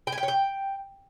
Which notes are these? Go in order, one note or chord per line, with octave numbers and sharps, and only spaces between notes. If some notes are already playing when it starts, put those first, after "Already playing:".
G5
G#5
G5
C#5
G5